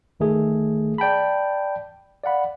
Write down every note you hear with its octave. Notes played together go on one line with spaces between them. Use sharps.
G1 D#3 A3 G#4
D5 G5 A5 B5
D5 F5 F#5 B5